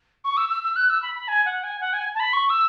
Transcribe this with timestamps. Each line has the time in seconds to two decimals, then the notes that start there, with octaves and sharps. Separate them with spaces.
0.24 C#6
0.37 E6
0.49 E6
0.63 E6
0.76 F#6
0.89 E6
1.02 B5
1.15 B5
1.28 G#5
1.45 F#5
1.63 G#5
1.80 F#5
1.93 G#5
2.14 A5
2.19 B5
2.33 C#6
2.49 E6